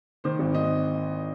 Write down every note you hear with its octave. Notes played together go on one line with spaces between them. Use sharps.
D#3 C5
G#1
D#3 D#5